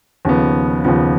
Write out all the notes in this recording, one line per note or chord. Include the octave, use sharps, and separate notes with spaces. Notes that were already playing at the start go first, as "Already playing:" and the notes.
D#2 C#3 F3 B3
D#2 C#3 F3 B3